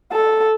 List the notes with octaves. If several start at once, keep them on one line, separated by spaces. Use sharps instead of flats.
A4